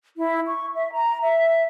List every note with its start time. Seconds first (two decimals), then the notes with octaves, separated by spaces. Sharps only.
0.17 E4
0.46 C#6
0.75 E5
0.92 A#5
1.21 E5